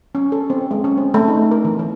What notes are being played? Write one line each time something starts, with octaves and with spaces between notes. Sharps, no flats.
C#4
A4
C4
G#3
C#4
C4
A3
D#4
A#4
E3
E3